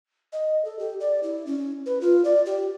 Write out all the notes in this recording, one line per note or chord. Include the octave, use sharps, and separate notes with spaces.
D#5
A4
G4
D5
E4
C#4
B4
F4
D5
G4